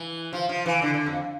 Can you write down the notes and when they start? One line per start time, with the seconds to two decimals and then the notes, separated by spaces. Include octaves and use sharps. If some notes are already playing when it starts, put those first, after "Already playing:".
Already playing: E3
0.33 F3
0.49 F3
0.66 E3
0.82 D3
0.94 D3
1.06 F2